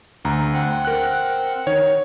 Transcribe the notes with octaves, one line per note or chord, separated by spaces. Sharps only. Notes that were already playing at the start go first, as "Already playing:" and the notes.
D2 A#5
C4 F#5
A#4 F#6
D#3 C#5